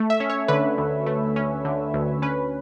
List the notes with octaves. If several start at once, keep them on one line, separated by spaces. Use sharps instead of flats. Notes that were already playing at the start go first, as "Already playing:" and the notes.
Already playing: A3
E5
C#4
C#5
D3 B4
D2
A3
C#4
D3
D2
C#4 B4